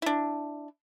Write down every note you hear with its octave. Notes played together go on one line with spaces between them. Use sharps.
D4 E4